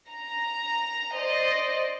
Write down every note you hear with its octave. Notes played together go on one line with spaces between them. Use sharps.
A#5
C5 D5 D#5